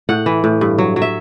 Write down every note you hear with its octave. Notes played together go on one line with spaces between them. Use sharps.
A2 F#5
E3
A2
G2
F#3
F#3
E5